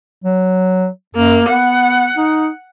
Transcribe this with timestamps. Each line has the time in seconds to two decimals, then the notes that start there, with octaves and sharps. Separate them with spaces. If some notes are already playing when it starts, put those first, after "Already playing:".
0.24 F#3
1.15 F#2 A#3
1.49 B3 F#5
2.17 D#4